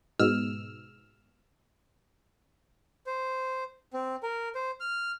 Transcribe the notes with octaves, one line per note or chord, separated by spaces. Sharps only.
G#2 B2 E6 F6
C5
C4
A#4
C5
F6